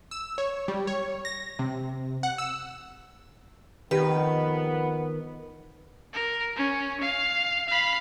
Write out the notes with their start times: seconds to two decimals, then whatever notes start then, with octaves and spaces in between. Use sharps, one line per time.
0.11 E6
0.38 C#5
0.68 G3
0.87 C#5
1.25 A#6
1.59 C3
2.23 F#5
2.38 E6
3.91 F2 D#3 B3 G4 B4
6.13 A#4
6.56 C#4
7.01 F5
7.69 F5 B5